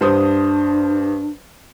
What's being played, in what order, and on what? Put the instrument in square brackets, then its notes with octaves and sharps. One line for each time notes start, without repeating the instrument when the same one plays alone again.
[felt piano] G2 C5 D#6 [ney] D4